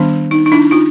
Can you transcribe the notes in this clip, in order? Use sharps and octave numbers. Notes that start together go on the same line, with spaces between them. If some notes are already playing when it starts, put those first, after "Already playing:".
Already playing: D#3 G3 B3 D4
D#4
D#4
D4 E4
D#4 F4